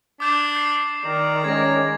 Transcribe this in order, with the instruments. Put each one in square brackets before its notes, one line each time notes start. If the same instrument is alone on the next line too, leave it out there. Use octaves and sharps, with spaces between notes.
[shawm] D4 [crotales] D6 G6 E7
[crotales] G6 C7
[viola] D#3 D5 [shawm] A#5
[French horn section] G#3 C#4 G#4 [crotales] G#6 A#6